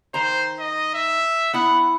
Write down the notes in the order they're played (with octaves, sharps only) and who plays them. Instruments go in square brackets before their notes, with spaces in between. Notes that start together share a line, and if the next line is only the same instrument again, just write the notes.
[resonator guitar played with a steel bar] D#3 A#5 [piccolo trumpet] C5
[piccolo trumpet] D#5
E5
[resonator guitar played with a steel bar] B3 E4 [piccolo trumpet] F#5